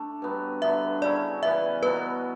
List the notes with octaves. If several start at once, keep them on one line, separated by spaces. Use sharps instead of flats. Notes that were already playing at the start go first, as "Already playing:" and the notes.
Already playing: A3 D4
G2 F#3 B3
G2 D3 F#3 B3 E5
C#3 F#3 C#4 E4 D5
C#3 E3 B3 E5
B2 F#3 B3 B4